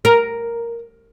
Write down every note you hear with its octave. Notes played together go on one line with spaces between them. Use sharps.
A#4